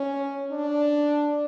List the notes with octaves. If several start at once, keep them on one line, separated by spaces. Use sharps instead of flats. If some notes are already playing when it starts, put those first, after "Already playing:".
Already playing: C#4
D4